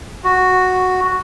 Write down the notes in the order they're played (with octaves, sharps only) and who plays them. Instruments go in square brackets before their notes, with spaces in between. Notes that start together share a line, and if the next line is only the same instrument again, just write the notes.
[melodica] F#4